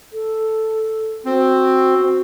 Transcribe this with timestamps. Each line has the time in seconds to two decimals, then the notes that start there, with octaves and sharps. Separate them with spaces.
0.13 A4
1.25 C4 F#4